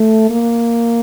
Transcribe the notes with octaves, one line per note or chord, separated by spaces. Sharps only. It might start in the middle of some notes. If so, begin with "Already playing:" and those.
Already playing: A3
A#3